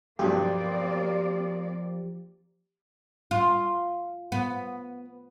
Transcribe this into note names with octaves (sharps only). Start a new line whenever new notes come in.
B1 G2 F3 A#3 C4 D4 G4 D5
F4
B3